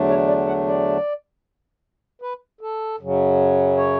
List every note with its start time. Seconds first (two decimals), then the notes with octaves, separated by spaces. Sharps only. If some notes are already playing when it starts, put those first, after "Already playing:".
Already playing: E2 D3 F#3 A3 D4
0.09 C#5
0.27 D5
0.47 F#5
0.67 D5
2.22 B4
2.61 A4
3.00 F#2 C#3 F#3
3.77 C#5